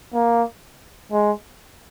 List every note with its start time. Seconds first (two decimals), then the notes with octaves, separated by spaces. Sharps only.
0.14 A#3
1.12 G#3